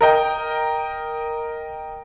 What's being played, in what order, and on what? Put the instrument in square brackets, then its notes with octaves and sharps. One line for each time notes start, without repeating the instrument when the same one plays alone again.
[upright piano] A#4 D#5 G5